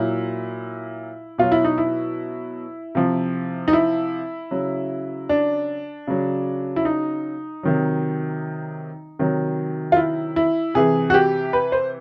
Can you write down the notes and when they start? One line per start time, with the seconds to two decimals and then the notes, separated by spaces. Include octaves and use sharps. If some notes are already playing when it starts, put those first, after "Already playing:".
Already playing: A#2 F#3 E4
1.38 B2 F#3 F4
1.52 E4
1.64 D#4
1.78 E4
2.95 C3 F3
3.68 D#4
3.73 E4
4.51 C#3 F#3
5.29 D4
6.07 C#3 F#3
6.76 E4
6.85 D#4
7.63 C3 D#3 F#3
9.19 C3 D#3 F#3
9.92 F4
9.97 E4
10.36 E4
10.74 C3 E3 G#4
11.10 F#4
11.14 G4
11.53 B4
11.72 C5